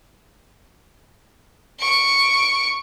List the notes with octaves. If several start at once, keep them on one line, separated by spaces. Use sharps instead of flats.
C#6 D7